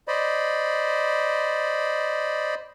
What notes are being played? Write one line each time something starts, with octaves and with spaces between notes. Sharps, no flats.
C5 D5 D#5 B5